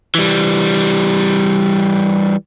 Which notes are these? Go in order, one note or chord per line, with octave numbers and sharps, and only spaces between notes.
E3 G3